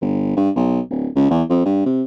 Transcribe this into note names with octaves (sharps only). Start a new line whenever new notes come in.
G1
G2
B1
D1
C#2
E2
F2
G2
C3